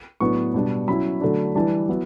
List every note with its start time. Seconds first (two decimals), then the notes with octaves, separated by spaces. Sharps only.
0.20 A2 F#3 B3 D4 C#6
0.54 B2 G3 D4
0.87 F#3 C#4 E4 B5
1.21 D3 F#3 A3 D4
1.55 E3 G3 D4 A5
1.89 F#3 B3 E4